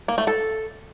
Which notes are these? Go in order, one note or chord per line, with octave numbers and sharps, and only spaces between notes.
A#3
A3
A4